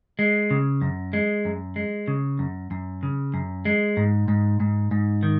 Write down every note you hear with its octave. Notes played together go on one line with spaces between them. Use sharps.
G#3
C#3
F#2
G#3
F#2
G#3
C#3
F#2
F#2
C#3
F#2
G#3
G#2
G#2
G#2
G#2
D#3